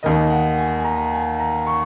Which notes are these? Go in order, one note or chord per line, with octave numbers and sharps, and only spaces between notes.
D#2 D#3 D#5
F#5
G#5
G#5
A#5
G#5
A#5
C#6